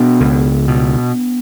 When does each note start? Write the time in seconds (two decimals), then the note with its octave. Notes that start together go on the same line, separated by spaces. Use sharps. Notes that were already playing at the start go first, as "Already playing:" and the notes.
Already playing: B2 B3 D4
0.20 C#2
0.68 B2